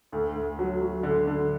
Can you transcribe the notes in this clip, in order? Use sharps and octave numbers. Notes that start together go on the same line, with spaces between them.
D2
D2
F#3
F#3
D3
D3